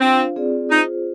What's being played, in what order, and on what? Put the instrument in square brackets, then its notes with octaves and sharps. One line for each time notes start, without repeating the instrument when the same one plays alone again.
[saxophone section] C4 [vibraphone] D4 F4 C5 F5
[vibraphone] C4 F4 G#4 D5
[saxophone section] D#4 [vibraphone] F4 G#4 C5